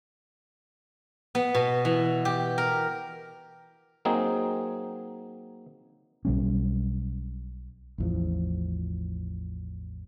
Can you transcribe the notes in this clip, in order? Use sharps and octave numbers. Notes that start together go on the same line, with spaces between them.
B3
B2
E3
G4
A#4
F#3 A#3 C4 D#4 G#4
B1 G3 C#4
A1 E2 F3